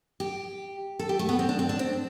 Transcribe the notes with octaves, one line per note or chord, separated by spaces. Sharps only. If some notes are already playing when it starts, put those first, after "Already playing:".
G4
A4
G4
A3
B3
C4
D4
C4
D4
C4